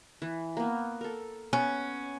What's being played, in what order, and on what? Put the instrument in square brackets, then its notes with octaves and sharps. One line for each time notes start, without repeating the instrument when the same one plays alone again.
[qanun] E3
A#3 B3
A4 A#4
[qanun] B3 [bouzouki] C#4